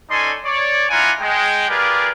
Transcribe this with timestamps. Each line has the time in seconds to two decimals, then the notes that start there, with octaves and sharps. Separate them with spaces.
0.10 C#4 D#4 A4 D5 G#5 C6
0.45 C#5 D5
0.90 D4 E4 F4 F#5 G#5 A#5
1.20 G#3 G5
1.69 F4 G4 G#4 A#4 B4 D5